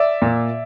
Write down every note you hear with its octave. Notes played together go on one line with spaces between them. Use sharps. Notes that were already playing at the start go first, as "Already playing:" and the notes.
Already playing: D5 E5
A#2